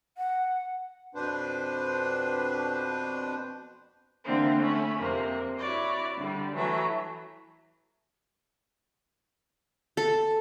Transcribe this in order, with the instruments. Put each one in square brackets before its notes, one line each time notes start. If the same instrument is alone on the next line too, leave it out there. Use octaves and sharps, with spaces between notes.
[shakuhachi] F#5
[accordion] F2 B2 D4 B4 C5
[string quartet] D3 E3 A#3 C4
A3 C#4 B5
F2 C3 A#3
E4 F#4 C#5 D5
D3 G3
E3 F#3 A3 E5
[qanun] A4